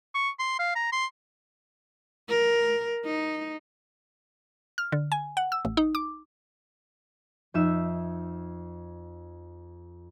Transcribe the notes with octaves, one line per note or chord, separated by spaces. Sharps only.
C#6
C6
F5
A#5
C6
A#4
D#4
F6
D3
G#5
F#5
E6
A1
D#4
D6
F2 D#4 E5 E6 E7